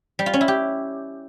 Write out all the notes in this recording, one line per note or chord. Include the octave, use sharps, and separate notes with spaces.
G3
F4
C#4
E4
G4